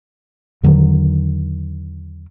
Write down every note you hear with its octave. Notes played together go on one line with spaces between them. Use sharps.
E2 D3 D#3 F#3